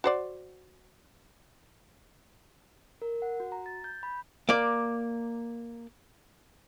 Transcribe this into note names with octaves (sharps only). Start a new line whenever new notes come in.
F#4 C5 D5
A#4
F#5
F#4
A#5
A6
G6
B5
A#3 D5